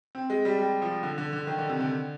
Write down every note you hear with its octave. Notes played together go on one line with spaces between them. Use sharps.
C4
G#3
G3
G3
F3
D3
D3
D3
D#3
D3
C3
D3